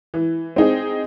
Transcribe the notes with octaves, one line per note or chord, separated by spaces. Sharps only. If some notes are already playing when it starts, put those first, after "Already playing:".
E3
C4 D#4 G#4